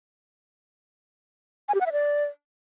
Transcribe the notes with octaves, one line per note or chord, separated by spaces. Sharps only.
G#5
G4
F#5
E5
D5